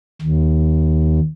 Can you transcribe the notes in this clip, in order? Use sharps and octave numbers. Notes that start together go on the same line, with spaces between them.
D#2